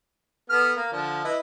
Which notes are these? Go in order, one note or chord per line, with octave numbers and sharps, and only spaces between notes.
B3 A4 F6
A#3
D3 F3 D5
E4 B4 D#5